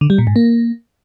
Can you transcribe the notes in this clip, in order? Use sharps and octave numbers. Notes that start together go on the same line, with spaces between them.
D3
G3
A#2
G#2
A#3